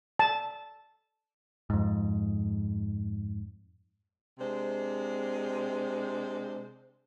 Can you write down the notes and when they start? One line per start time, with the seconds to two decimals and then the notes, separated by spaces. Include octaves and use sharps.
0.19 A5
1.70 F2 G#2
4.39 C3 G#3 D4 C5